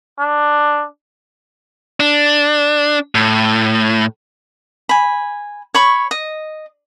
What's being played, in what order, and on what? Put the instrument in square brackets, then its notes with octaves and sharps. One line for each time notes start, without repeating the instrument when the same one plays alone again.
[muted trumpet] D4
[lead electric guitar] D4
A2
[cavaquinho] G#5 B5
C#5 B5 C#6
D#5